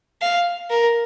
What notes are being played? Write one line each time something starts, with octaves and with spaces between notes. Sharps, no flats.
F5
A#4